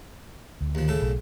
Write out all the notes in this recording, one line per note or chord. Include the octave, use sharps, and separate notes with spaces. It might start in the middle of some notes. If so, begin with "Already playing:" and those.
D2
D#2 F3
A2 C#3 A4
B1